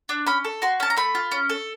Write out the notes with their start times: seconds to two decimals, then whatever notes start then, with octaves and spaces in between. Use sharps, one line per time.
0.09 D4
0.27 C#4 B5
0.44 A4
0.62 F#4 C6
0.80 C#4 A5
0.90 A#5
0.96 A3 B5
1.15 F4
1.32 C#4
1.50 A4